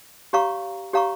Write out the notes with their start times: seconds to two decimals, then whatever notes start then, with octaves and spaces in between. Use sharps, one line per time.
0.33 G4 C#5 F5 A#5 C#6
0.93 G4 C#5 F5 A#5 C#6